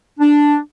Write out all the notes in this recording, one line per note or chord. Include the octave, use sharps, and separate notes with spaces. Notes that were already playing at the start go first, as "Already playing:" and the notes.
D4